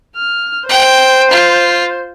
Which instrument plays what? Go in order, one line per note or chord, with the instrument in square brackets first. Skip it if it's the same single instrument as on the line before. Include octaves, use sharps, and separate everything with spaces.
[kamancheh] F6
[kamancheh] C5 [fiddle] G5
[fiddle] F4